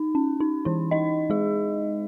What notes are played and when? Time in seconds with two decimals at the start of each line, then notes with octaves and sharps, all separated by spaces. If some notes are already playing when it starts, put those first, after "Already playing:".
Already playing: D#4
0.15 C#4
0.40 D#4
0.65 E3 E4
0.91 D#4 D#5
1.30 G#3 G#4